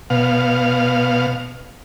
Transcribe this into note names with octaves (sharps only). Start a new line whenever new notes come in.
B2 F5